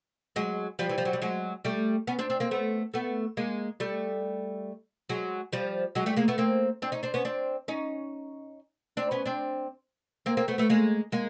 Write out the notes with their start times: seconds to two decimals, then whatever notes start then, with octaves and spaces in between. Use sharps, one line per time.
0.36 F#3 G#3
0.79 F3 G3
0.89 E3
0.98 F3
1.05 F#3
1.13 G3
1.22 F#3 G#3
1.65 G3 A3
2.07 B3 C#4
2.19 C4 D4
2.30 C4 D4
2.40 A#3 C4
2.51 A3 B3
2.94 A3 B3
3.37 G#3 A#3
3.80 G3 A3
5.09 F#3 G#3
5.52 F3 G3
5.95 F#3 G#3
6.06 G3 A3
6.16 G#3 A#3
6.28 A3 B3
6.38 A#3 C4
6.82 C4 D4
6.92 C#4 D#4
7.03 C4 D4
7.14 B3 C#4
7.25 C4 D4
7.68 C#4 D#4
8.97 C4 D4
9.11 B3 C#4
9.26 C4 D4
10.26 A#3 C4
10.37 A#3 C4
10.48 A3 B3
10.58 A3 B3
10.69 G#3 A#3
11.12 G#3 A#3